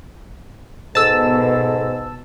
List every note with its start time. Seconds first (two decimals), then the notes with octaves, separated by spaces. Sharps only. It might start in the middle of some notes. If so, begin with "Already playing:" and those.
0.95 G#2 B2 A4 A5 E6